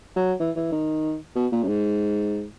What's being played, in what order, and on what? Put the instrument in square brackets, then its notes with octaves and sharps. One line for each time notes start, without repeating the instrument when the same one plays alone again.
[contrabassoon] F#3
E3
E3
D#3
B2
A#2
F#2
G#2